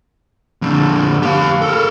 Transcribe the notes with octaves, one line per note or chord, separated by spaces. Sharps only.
F2 D3
G4 F5
A4 A#4